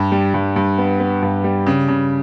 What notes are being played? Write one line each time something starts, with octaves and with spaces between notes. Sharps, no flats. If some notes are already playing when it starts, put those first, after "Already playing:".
Already playing: G2
G3
G2
G2
B3
B3
G2
G3
C#3
C#3